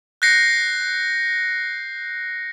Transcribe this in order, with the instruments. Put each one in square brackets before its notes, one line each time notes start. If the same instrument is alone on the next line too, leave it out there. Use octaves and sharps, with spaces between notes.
[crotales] F#6 G6 A#6 C7 C#7